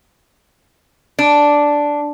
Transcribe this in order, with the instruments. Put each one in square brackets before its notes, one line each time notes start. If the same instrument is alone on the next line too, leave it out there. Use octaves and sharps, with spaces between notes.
[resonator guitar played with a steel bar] D4